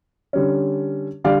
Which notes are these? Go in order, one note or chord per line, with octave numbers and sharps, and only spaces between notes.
D3 G3 C#4
D3 G3 D5 F5